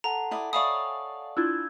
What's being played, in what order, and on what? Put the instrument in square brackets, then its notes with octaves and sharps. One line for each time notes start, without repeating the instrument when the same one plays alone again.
[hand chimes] A4 F#5 A5 [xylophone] A#5
[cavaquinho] E4 D5 D#6
[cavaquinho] C#5 E5 B5 [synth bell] D5 F5 G#5 [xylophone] D#6
[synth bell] D4 E4 F4 [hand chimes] E6 G6 G#6